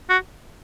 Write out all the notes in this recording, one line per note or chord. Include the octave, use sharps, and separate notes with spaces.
F#4